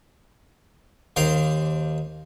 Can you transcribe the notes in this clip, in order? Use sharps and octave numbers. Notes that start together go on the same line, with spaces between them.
D#2 C5 F5 D6